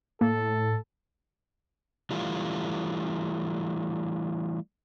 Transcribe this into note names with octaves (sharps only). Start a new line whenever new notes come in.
A2 A#3 A4
E3 G3 A3 F4